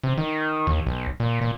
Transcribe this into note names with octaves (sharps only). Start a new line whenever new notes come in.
C3
D#3
D#2
B1
A#2
A#2